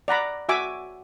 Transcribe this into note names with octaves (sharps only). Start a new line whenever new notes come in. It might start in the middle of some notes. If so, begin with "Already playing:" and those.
D5 F#5 A#5 B5
F#4 E5 G#5 D6